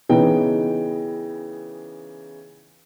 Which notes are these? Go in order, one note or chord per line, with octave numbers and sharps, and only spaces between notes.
C#3 E3 B3 D#4 G5